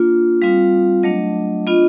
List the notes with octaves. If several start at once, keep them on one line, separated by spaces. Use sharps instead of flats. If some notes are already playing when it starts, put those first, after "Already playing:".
Already playing: A#3 D4 F4
G3 C4 F4 F5
F#3 A3 D4 D#5
B3 D4 F4 D#5